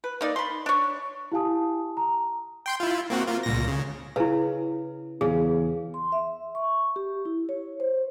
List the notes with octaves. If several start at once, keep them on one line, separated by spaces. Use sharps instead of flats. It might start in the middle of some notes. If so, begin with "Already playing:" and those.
B4
A#3 D#4 D5
B5 C6
D4 C#5
E4 G4 F5 G#5 A5 D#6
A#5
G5 C6 G6
E4 F4
A#3 C4 F#4
A#3 F4
C#2 A#2 A#6
C#3
C#3 E4 B4
E2 C#3 G#4
C6
E5
C#6
G4
E4
C#5
C5